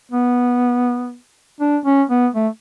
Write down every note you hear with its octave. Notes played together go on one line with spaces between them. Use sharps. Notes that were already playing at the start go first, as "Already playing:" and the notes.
B3
D4
C#4
B3
A3